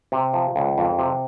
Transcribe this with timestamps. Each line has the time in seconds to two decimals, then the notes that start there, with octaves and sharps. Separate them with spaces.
0.12 C3
0.34 F3
0.56 C#2
0.78 F2
0.99 C3